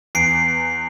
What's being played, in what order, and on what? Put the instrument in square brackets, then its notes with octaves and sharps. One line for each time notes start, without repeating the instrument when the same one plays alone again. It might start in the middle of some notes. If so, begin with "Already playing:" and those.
[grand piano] E2 [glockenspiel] C7 D7